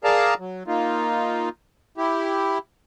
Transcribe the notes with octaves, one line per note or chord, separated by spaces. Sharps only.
G#4 A#4 D5 F5 A5 A#5
F#3
A#3 D#4 F4
E4 G4